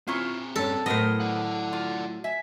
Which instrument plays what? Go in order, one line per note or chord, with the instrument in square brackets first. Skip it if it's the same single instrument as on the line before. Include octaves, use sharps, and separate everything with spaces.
[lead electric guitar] C4 A#5 [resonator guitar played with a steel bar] C#4 E4 F4
[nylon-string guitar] G2 C#4 [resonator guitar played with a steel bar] G3 [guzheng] A4
[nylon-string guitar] A2 F#3 [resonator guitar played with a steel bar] B3 A#4 C5 [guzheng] D#5
[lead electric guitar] D5 F#5
[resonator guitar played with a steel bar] F4
E5 G#5